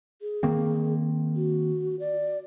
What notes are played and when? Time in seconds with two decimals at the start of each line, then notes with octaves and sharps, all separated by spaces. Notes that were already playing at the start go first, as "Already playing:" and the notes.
0.22 G#4
0.43 D#3 A#3 C4
1.36 F#4
2.00 D5